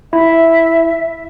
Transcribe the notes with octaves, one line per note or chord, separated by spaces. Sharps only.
E4 E5